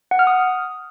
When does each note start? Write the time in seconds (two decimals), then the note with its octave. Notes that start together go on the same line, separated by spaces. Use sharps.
0.11 F#5
0.19 F6
0.27 D#6